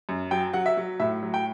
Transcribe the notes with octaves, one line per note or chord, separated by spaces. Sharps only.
F#2
F#3 G5
F#3 F#5
E5
F#3
A2 E5
F#3
G5